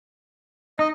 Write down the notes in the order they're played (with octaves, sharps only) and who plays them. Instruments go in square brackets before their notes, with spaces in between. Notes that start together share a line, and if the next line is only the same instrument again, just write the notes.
[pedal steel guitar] D#4 [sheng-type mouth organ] D#5